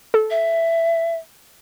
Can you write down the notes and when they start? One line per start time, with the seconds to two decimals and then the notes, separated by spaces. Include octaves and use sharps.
0.14 A4
0.31 E5